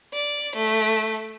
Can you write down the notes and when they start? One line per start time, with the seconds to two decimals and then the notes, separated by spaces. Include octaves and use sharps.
0.14 D5
0.56 A3